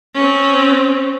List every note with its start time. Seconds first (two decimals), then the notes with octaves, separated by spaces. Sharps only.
0.15 C4 C#4